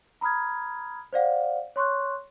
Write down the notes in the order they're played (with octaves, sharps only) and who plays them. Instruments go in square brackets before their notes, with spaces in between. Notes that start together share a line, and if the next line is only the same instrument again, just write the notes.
[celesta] A#5 B5 D#6 F6 G#6
C5 D5 F5 F#5
C#5 C6 C#6 F#6